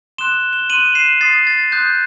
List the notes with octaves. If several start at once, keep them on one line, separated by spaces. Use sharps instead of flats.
C6 D#6 F#6 E7 G7
E7 G7
C6 D#6 F#6 D#7 F#7
C7 E7
C6 D#6 F#6 A6 C7
A6
C6 D#6 F#6 G6